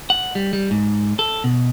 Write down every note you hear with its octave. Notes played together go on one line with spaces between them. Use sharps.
F#5
G3
G3
G#2
A4
B2